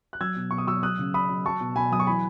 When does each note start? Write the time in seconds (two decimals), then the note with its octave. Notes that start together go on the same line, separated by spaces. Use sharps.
0.13 F#6
0.21 F#3 E6 G#6
0.36 B2
0.51 B2 C#6
0.58 D#6
0.67 F#3 C#6 E6
0.83 F#3 D#6 F#6
0.99 C#3
1.14 C#3 B5 D#6
1.30 F#3
1.45 F#3 A5 C#6
1.61 B2
1.76 B2 G#5 B5
1.92 F#3 D#6
2.00 C#6
2.07 E3 G#5 B5